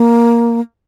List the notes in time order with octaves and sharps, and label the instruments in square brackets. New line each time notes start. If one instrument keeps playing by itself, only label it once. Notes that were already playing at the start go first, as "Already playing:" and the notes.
Already playing: [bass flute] A#3